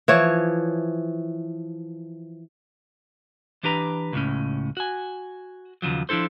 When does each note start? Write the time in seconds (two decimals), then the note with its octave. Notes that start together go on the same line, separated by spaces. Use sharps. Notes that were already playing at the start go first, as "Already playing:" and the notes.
0.08 E3 F3 C#5
3.63 E3 D4 G4 B4 A#5
4.13 C#2 A2 C#4
4.77 F#4 G#5
5.82 D#2 C#3 F3 F#3
6.09 F3 D4 E4 A4 C5